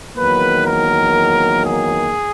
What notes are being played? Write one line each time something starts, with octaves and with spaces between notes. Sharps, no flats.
E2 D#3 F#3 A#3 B4
A#4
G#4